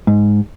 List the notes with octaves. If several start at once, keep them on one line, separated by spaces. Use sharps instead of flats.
G#2